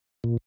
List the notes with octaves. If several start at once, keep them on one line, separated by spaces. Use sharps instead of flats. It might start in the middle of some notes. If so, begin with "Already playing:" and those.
A#2